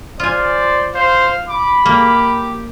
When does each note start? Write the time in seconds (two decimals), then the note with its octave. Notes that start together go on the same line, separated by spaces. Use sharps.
0.20 F4 C5 D5 G#5
0.95 C5 F5
1.48 B5 D6
1.85 A#3 G4